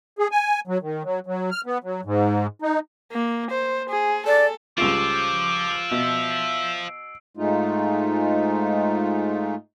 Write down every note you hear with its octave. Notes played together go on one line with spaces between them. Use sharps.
G#4
G#5
F#3
D#3
F#3
F#3
F6
B3
F#3
G#2
D#4
A#3
C5
G#4
A4 D5
C#2 F3 G3 F4 D6 E6 C7 D7
B2 E5
G#2 G#3 A3 D#4 F4